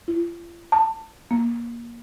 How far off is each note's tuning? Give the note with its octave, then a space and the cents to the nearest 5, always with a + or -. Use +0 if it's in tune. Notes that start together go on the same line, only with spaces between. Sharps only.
F4 -40
A5 +25
A#3 +15